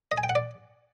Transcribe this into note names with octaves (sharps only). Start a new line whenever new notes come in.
D#5
G#5
G5
F#5
D5